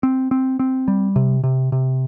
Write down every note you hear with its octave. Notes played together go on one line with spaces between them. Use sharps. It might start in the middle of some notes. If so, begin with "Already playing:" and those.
C4
C4
C4
G3
C3
C3
C3